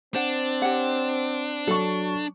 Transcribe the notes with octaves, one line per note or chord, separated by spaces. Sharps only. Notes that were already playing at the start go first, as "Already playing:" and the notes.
C4 D4 C5 F#5
G4 C#5 F#5
F#3 A4 C#6